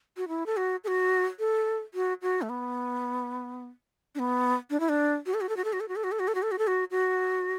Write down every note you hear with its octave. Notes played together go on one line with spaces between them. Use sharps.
F#4
E4
A4
F#4
A4
F#4
A4
F#4
F#4
A3
B3
D4
B3
D4
E4
D4
F#4
A4
F#4
A4
F#4
A4
F#4
A4
F#4
A4
F#4
A4
F#4
A4
F#4
A4
F#4
A4
F#4
F#4